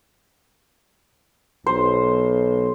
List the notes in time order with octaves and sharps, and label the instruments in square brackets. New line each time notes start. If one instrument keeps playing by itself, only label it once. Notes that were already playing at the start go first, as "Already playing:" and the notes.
[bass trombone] B1 [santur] C5